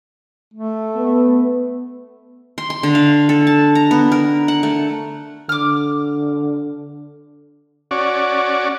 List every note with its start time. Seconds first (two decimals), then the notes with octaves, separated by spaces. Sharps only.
0.54 A3
0.96 B3
2.58 C6
2.70 C6
2.83 D3
2.95 F5
3.29 A4
3.47 A5
3.75 A#5
3.91 B3
4.12 A#4
4.48 F#5
4.63 A3
5.49 D3 D6 F6
7.91 C#4 F#4 D5